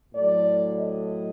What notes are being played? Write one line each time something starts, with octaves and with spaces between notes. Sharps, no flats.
A2 F#3 D5
D#5